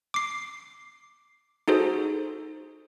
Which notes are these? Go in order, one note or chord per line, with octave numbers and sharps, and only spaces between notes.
D6 C7
D#4 F#4 G#4 A4 C5